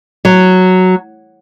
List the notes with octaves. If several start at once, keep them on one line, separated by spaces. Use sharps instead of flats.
F#3